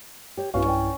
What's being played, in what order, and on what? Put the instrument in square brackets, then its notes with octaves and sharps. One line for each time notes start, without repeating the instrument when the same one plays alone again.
[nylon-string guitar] G4 C#5
[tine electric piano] B1 G2 E4 [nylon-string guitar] B3 F#4 F5 [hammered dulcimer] C#4
[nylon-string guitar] D5 G5